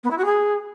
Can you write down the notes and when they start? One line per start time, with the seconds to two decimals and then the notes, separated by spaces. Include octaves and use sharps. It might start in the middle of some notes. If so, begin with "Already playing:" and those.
0.04 B3
0.11 E4
0.18 F#4
0.25 G#4